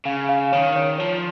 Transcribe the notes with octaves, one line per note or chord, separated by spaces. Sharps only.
C#3 F5
F5
D#3 C#5
C#5
F3 C#5